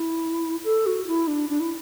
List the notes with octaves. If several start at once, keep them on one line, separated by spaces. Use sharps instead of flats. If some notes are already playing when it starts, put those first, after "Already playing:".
Already playing: E4
A4
F#4
E4
D4
D4
E4